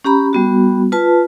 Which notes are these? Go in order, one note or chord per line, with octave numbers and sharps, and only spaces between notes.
C#4 G4 A#5 B5
G3 B3 F#4
F4 B4 A5